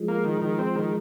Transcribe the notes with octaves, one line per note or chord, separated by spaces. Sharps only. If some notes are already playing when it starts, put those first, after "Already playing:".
Already playing: F3 G#3
A#3
D#3
D#3
C4
D#3